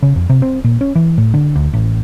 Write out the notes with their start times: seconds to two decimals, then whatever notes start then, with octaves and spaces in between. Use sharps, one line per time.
0.02 C#3
0.16 F2
0.29 C3
0.42 C4
0.64 A#2
0.81 C#4
0.95 E3
1.18 A2
1.34 D3
1.56 D2
1.73 A1